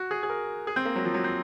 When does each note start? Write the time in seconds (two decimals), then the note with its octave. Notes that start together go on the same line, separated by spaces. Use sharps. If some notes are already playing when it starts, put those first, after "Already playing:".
Already playing: F#4
0.11 G#4
0.23 G#4
0.30 A#4
0.67 G#4
0.76 C4
0.85 A#3
0.96 F#3
1.05 F3
1.14 F#3
1.24 C4